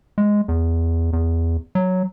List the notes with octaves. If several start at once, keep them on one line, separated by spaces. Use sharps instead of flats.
G#3
E2
E2
F#3